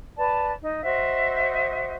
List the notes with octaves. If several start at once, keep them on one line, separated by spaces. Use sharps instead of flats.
B4 D5 A5
D#4
F#4 C5 D#5 E5